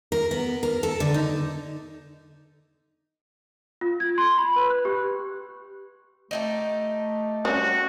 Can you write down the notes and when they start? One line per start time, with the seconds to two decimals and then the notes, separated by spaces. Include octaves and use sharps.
0.12 A#4
0.31 B3
0.63 A#4
0.83 A4
1.00 D3
1.14 D#4
3.81 F4
4.00 G#6
4.18 C6
4.38 B5
4.56 B4
4.70 F#6
4.85 G4
6.31 A3 D#4 E4 G4
7.45 G3 C#4 F#4